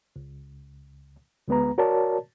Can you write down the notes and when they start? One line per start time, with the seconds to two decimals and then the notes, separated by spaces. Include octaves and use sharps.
0.16 C#2
1.48 D2 G#3 B3 B4 A#5
1.78 F#4 A#4 C#5 D5 A5